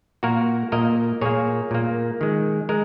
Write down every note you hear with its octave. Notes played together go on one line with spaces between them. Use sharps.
A#2 A#3 F#4 A#4
A#2 A#3 A#4 D#5
A#2 A#3 G#4 C#5
A#2 A#3
D#3 G#3
G#3 A#4